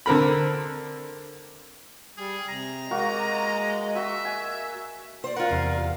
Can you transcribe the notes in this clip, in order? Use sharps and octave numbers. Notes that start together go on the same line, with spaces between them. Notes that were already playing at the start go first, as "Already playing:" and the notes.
D3 C4 A#4 B5
G3 G#4
C3 A#5
G#3 A#3 F#4 D#5 C#6
F#4 E5 C#6
G#5
C5 D5
F4 A#4 F#5
E2 C3 F5